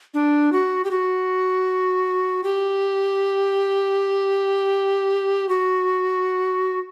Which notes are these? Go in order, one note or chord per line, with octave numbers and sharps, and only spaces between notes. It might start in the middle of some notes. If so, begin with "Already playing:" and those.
D4
F#4
G4
F#4
G4
F#4